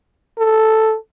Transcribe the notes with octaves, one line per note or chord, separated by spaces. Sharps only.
A4